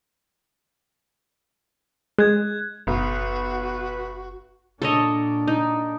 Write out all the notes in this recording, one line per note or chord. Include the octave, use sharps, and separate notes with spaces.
G#3 F#6 G#6
F#1 B1 F#4 B4
A#2 D4 A4 C#5 D#5
D#4